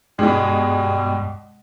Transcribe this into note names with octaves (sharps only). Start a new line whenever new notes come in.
G2 B2 G3 G#3